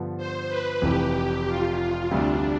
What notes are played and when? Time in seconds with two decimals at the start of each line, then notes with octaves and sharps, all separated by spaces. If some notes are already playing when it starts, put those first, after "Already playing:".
Already playing: G2 D3 F3 B3
0.18 C5
0.49 B4
0.81 F1 F2 E3 G4
1.47 F4
2.11 D2 C3 G3 D4